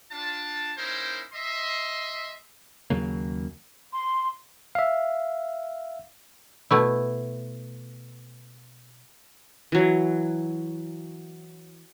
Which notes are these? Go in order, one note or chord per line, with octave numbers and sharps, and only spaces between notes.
D4 F4 A5
A#3 C#4 D#4 E4 A#4 C5
D#5 E5 C6
D#2 C#3 F#3 A#3
C6
E5 F5
B2 A3 E4
E3 F#3